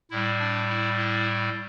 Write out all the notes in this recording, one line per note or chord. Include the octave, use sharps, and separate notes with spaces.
A2 G3 E4
D4
E4
E4